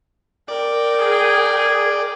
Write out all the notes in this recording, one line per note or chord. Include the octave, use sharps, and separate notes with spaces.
A#4 D5 G5
G#4